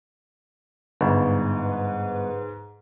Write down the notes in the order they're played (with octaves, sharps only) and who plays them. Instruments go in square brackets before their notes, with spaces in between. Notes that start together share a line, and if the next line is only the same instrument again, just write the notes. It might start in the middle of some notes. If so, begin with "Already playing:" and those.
[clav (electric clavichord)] G1 [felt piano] G#2 [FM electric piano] B4